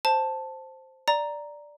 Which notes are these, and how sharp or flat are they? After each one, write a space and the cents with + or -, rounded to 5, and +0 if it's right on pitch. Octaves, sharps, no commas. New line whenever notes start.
C5 +0 A5 +0
D5 +0 A#5 +0